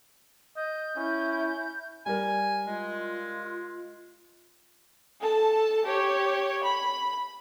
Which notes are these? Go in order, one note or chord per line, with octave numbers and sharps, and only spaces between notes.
D#5 G6
C#4 E4
G3 A#4 G#5
G#3 F4
A4 A5
G4 C#5
B5